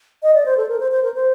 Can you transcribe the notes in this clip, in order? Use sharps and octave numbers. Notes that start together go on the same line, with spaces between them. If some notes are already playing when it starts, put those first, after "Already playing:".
D#5
D5
C5
A4
A#4
C5
C5
A#4
C5